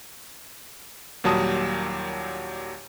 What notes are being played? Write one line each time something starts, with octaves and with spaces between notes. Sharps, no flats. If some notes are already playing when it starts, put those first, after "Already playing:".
D#2 A#2 F#3 G3 A5 D#6